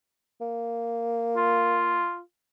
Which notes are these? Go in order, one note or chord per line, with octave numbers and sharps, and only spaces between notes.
A#3
F4